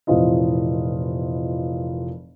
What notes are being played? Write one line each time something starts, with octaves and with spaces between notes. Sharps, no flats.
F1 A#2 E3 C4 F4 D#5